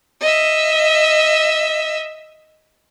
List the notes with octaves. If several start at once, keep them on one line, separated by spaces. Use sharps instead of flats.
D#5 E5